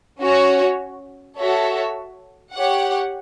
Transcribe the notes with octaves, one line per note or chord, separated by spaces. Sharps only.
C#4 F#4 C#5
F#4 A4 C#5 E5
G4 C#5 F#5